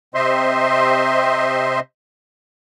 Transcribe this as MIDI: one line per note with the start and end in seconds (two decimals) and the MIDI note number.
0.14 1.80 48
0.14 1.80 60
0.14 1.80 72
0.14 1.80 75
0.14 1.80 76
0.14 1.80 84